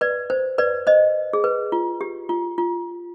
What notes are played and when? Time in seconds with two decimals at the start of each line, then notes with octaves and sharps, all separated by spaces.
0.01 B4 D5
0.30 C5
0.58 B4 D5
0.87 C5 D#5
1.33 G#4
1.44 B4
1.72 F4
2.01 G4
2.29 F4
2.58 F4